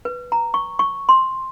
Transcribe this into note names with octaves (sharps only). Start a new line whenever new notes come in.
B4
A#5
C#6
C#6
C6